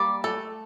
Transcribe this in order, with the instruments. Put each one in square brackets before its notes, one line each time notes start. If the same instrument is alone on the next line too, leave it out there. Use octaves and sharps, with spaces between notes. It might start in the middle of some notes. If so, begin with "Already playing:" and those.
Already playing: [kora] G3 A#3 [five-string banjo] D5
[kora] A3 [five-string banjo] A4